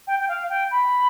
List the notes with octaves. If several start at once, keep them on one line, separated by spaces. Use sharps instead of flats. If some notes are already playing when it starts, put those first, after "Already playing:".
G5
G5
F5
G5
B5